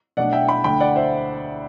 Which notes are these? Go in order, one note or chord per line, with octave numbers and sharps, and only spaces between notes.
B1 B2 A3 D4 D5 F#5
E5 G5
G5 B5
D2 D3 A3 D4 G5 B5
D5 F#5
C5 E5